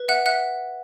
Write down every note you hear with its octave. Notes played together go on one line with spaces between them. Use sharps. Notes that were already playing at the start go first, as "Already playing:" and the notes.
Already playing: B4
E5 F#5 F#6
E5 F#5 F#6